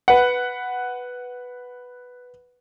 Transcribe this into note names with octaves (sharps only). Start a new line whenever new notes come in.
B4 F#5